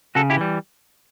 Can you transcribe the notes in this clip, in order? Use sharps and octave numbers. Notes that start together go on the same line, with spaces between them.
C#3 F#4 A4
E4 G4
E3 G3